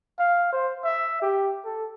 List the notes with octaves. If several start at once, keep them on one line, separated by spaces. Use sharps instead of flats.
F5
C5
E5
G4
A4